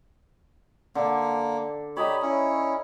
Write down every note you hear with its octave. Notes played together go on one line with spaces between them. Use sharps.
D3 A#3
G4 C#5 D#5 A#5 B5
C#4 E4